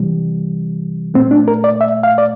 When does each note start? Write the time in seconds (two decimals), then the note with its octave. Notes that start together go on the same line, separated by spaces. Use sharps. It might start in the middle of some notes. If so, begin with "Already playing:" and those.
Already playing: C3 E3 G3
1.14 A#2 A3 C4
1.31 D4
1.48 A#4
1.64 D5
1.81 E5
2.03 F5
2.18 D5